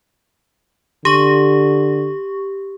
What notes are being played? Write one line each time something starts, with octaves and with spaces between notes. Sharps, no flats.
D3 G4 C#6